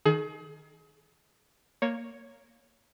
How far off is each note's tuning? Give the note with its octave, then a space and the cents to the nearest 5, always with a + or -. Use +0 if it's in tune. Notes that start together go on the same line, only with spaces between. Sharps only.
D#3 +0 G#4 +35
A#3 +0 C#5 +0